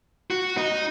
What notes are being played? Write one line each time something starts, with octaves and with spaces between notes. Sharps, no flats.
F#4
D#4